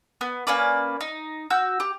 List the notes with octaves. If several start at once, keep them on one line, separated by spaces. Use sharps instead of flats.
B3
A#3 C#4 B4 D5
D#4
F#4 E6 G6
G4